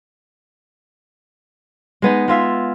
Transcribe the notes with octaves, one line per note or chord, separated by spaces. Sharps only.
G#3 B3 D#4
G#3 F4 E5 F5